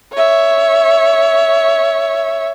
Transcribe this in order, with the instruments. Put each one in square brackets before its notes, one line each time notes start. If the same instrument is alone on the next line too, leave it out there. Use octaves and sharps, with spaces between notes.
[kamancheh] C#5 E5